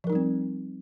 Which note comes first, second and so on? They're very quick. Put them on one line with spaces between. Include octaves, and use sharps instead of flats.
F3 A#4 D#4 G3 C4